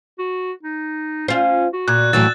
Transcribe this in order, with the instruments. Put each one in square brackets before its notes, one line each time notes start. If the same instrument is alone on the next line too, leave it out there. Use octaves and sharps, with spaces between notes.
[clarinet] F#4
D#4
[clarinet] C#4 [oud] F4 C5
[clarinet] F#4
[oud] A#2 [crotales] F#6 G#6
[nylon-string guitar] A2 E3 F#3 [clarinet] E6 [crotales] A6